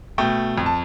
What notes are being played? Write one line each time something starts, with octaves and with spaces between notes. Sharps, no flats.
B2 A3 G5
F2
A5